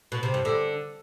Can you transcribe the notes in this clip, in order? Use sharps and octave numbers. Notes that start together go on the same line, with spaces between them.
B2
C3
G2
D3